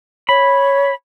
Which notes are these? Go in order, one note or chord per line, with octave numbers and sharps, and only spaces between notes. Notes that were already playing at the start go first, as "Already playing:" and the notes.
C#5 B5